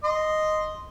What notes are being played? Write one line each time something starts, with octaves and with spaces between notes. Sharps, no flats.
D#5 C6